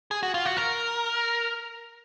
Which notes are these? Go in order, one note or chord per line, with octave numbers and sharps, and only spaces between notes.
G#4
F#4
F4
F#4
A#4